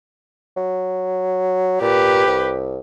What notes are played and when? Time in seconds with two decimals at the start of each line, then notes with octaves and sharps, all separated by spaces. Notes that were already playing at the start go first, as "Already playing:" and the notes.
0.57 F#3
1.81 A#2 G4 B4
2.26 C2